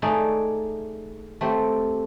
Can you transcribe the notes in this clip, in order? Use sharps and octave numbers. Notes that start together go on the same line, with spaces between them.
A3 D#4 G#4 D5
A3 C4 G4